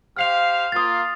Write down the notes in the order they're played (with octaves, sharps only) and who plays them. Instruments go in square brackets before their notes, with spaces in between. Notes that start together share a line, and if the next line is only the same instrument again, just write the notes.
[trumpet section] G4 C5 F5 [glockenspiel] F6 C7 F7
[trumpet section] A#3 F4 [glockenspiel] D#6 A6